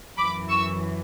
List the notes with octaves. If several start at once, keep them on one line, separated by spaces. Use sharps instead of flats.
F#2 E3 B5 D6
C#6 E6